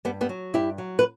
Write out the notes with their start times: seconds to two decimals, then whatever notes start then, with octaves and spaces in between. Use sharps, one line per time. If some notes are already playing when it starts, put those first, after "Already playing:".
0.05 G2 G3 B3
0.21 G3 B3
0.29 F#3
0.54 G2 E4 G4
0.78 F#3
0.99 B4